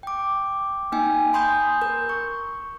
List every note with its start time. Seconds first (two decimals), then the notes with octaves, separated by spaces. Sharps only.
0.03 G5 D6
0.92 A#3 D#4 G5 G#5
1.33 G#5 B5 C6 D#6 G6
1.82 A#4 G6
2.09 C#6